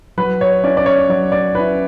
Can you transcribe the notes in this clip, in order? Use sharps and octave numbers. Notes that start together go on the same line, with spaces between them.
F#3 B4
C#5
C#4 E4 D5
D5
C#5
F#3 D5
D5
C#4 E4 B4